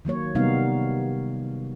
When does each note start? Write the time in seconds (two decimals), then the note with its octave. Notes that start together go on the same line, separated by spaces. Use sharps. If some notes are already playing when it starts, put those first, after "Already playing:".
0.05 D#3 F#3 A#3 C#5
0.35 C3 G3 A#3 B3 D#4 F5